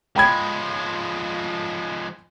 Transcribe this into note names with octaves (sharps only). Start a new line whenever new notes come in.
F3 G#3 G5 B5 G#6